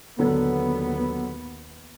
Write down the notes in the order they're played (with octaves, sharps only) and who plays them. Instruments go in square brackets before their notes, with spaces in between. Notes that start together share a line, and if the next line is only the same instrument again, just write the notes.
[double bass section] D#2 B3 [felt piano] D3 F#3 A4